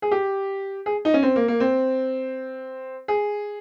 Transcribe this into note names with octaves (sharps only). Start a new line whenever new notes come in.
G#4
G4
G#4
D#4
C#4
C4
A#3
A#3
C4
G#4